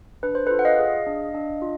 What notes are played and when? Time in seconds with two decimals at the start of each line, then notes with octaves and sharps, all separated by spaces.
0.23 D4 B4
0.35 C5
0.46 F4 A4 B4
0.59 F#5
0.65 D#5 F5
0.79 G#4
1.06 D4
1.35 D4
1.62 F4